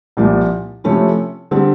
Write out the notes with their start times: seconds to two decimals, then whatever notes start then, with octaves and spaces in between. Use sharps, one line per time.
0.17 C2 A#2 F3
0.84 C3 F3 A3 C#4 E4
1.51 D3 G3 C4